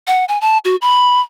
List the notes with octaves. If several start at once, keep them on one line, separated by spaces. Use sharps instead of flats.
F#5
G#5
A5
F#4
B5